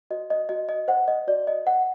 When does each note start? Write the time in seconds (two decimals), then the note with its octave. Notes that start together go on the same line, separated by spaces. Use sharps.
0.10 F#4 C5 D#5
0.30 D#5
0.49 F#4 D#5
0.69 D#5
0.88 C5 F#5
1.08 D#5
1.27 F#4 D5
1.47 D#5
1.66 C5 F#5